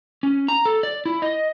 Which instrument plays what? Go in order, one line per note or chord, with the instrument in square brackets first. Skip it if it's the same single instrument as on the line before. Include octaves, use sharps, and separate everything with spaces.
[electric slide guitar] C#4
A#5
A4
D5
E4
D#5